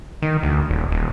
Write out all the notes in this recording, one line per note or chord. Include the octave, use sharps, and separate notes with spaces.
D#3
D2
D#1
D#1